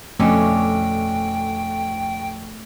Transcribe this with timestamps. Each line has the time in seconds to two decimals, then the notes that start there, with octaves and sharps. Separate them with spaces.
0.20 F2 B2 D3 A3 C#4 G5